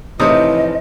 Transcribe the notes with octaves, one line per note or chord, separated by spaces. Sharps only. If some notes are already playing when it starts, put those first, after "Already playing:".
A2 C3 E3 F3 D#4 D#5 D#6